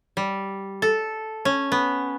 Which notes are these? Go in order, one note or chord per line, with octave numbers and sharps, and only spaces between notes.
G3
A4
C#4
B3